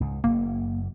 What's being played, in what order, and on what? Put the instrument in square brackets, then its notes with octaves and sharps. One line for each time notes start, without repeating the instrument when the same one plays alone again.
[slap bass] C#2 G#2
[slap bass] F#1 F#2 [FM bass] A#3